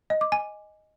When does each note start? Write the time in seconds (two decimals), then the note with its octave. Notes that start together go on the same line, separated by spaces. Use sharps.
0.10 D#5
0.21 D6
0.32 G#5